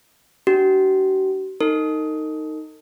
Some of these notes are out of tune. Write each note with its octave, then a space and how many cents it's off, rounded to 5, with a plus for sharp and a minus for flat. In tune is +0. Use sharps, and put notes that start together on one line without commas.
D4 -5 F#4 +45
D#4 +0 A#4 -45